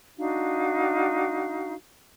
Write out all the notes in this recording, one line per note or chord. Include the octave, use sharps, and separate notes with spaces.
D4 D#4 F#4 F5